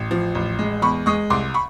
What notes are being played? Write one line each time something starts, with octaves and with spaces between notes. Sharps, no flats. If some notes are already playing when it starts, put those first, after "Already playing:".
Already playing: A1
F3
A1
G#3
E2 B5 C#6
G#3 C#6 D#6
C2 C6 D6
B5 C#6